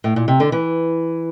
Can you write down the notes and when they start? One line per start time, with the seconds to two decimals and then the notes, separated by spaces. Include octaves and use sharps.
0.04 A2
0.16 A#2
0.28 C3
0.40 D3
0.52 E3